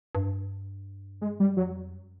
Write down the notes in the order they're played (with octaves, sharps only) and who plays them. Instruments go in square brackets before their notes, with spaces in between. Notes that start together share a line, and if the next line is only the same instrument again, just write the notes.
[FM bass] G2
[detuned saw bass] G#3
G3
[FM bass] F2 [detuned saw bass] F#3
[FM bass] F#2